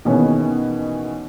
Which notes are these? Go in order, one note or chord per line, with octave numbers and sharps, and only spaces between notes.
B2 D#3 E3 B3 C#4 G#4